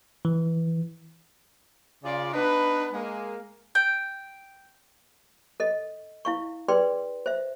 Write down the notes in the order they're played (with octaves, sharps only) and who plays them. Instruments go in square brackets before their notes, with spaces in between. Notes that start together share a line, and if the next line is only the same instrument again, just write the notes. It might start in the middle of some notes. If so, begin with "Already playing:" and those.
[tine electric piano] E3
[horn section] C#3 F4 D5
B3 D4 D#4 B4
G#3 A#3
[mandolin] G5
[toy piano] A4 D#5
E4 F5 C#6
G#4 B4 D5 G5 C6
C5 E5